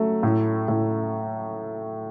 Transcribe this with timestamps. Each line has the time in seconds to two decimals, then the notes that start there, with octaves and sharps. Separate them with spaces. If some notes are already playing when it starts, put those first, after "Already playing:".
Already playing: F#3 A3
0.23 A2
0.68 A2